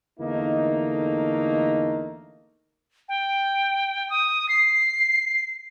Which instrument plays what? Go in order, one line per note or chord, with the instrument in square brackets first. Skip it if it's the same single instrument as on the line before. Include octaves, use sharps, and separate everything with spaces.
[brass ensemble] E2 D3 A3 A#3 D#4
[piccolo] G5
D#6
C7